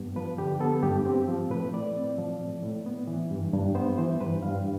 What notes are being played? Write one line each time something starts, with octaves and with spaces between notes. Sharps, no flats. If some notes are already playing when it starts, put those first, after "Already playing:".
Already playing: G2 B3
F3 B4
D3 G4
B3 A4
G2 G4
C4 G4
F3
A2 B4
A2 D5
C4
F3
A2
A2
B3
E3
G2
G2
B3 C5
E3 C5
G2 B4
G2 F5